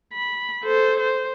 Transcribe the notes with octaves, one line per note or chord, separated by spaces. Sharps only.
B5
A4 C5
C5